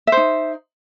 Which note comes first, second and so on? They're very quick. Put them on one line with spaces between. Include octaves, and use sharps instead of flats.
E5 C5 D#4